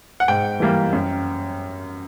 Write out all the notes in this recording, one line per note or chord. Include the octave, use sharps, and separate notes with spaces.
F#5
G#2 G5
E3 G3 A#3
F#2